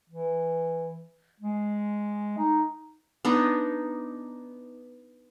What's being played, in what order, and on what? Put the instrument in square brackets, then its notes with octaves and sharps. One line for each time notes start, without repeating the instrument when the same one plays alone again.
[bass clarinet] E3
G#3
D#4
[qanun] B3 D4 D#4